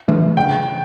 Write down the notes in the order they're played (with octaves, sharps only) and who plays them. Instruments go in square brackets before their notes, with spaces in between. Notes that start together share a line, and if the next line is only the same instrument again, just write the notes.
[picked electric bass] C#3 E3 A3 D4
[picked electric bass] C#3 [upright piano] G5